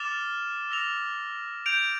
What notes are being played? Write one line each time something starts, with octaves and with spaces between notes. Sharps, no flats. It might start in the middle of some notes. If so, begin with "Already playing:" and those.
Already playing: D6 F6 A6 E7 G7
E6 A#6 F7
G6 D7 F7